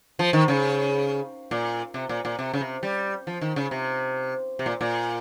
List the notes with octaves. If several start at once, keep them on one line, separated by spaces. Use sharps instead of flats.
F3
D#3
C#3
A#2
C3
A#2
A#2
C3
C#3
C3
G3
F3
D#3
C#3
C3
C3
A#2
A#2